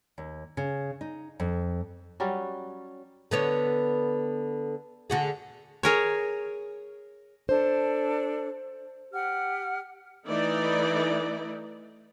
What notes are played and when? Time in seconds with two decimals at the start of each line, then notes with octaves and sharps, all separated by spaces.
0.18 D#2
0.57 C#3
1.01 D#4
1.40 F2
2.20 F#3 G3 C#4
3.31 D3 B3 C#5
5.10 D3 F#4 G#4
5.83 G#4 A#4 C#5
7.49 D4 A4 C5
9.12 G4 F#5 F6
10.26 E3 A3 D#4 E4 D5